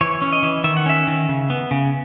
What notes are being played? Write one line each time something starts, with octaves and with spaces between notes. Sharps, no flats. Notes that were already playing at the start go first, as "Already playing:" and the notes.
E3 C#5
C#4
D#5
E3
D#3 E5
F#5
C#4 E5
D#3
C#3
B3
C#3